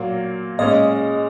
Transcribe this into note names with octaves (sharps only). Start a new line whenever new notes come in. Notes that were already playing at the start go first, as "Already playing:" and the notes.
Already playing: A#2 F#3 A#3
A#2 G#3 C#4 D#5